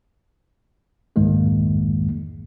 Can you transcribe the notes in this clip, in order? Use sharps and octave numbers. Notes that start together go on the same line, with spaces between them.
C2 F2 G#2 D#3 G#3 A#3